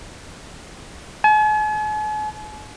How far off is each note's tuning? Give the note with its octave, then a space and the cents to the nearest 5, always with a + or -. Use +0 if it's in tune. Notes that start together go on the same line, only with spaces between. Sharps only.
G#5 +45